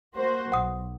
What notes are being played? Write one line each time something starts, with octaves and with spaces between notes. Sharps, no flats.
A#3 F#4 C5
B1 F#5 D#6